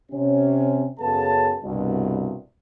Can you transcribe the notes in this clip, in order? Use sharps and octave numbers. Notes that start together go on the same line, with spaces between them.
C3 C#4
F#2 C#3 B3 G#4 A4 A5
C2 G2 B2